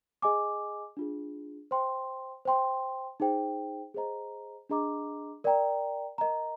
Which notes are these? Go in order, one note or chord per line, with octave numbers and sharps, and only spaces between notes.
G#4 D#5 G#5 D6
D4 F4 G#4
C5 G5 C6
C5 G5 C6
D#4 G#4 C5 G5
G#4 C5 D#5 A#5
D4 G#4 D#5 A#5 D6
A#4 D5 G5 A#5
A#4 D#5 A#5